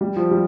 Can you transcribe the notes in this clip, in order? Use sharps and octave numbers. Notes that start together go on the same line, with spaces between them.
G3
F3
G3